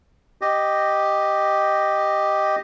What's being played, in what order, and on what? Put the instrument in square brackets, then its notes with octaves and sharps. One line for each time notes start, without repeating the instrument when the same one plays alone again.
[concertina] G4 D#5